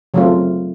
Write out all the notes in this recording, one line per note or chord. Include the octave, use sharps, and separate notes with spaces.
C#3 F#3 A3 C4 F4